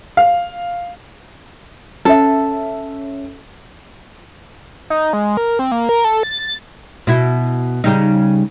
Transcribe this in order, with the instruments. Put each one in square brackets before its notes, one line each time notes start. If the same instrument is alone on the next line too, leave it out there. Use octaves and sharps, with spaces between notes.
[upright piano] F5
[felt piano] C#4 E5 [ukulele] A4
[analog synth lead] D#4
G#3
A#4
C4
A#3
A#4
A4
A6
[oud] B2 E4
C#3 G3 D#4